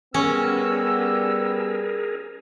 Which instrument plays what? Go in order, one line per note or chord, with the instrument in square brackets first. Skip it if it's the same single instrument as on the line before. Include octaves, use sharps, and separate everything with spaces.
[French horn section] G3 B3 [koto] C#4 [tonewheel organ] G#4 A#4 [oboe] E6